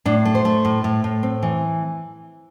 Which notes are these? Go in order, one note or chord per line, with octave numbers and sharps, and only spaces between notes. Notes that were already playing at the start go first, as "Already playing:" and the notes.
A2 D4
A3
C5
A3
A2
A2
A2
C4
E3